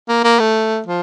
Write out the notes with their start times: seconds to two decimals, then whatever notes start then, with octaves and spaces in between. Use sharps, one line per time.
0.08 A#3
0.24 A#3
0.39 A3
0.86 F3